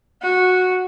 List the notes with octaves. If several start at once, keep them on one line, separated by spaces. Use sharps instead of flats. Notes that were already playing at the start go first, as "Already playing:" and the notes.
F#4